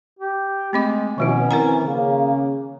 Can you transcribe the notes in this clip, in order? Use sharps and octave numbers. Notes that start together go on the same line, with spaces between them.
G4
G#3 A3 C4 D6
B2 D#3 F3 C#4 E4
E3 C4 A#4 F#5 A#5
C#3 A#3